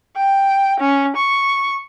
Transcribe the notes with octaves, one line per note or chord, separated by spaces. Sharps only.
G5
C#4
C#6